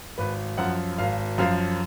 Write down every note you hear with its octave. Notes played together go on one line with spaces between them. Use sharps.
G#1 B4
F#2 F3 F#5
G#1 F5
F#2 F3 F5